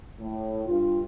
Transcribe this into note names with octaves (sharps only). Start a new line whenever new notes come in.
A2
G2 F4